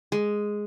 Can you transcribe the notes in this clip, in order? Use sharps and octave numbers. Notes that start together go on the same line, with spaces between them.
G#3